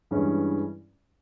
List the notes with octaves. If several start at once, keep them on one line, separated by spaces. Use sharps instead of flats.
G2 E3 G#3 C#4 E4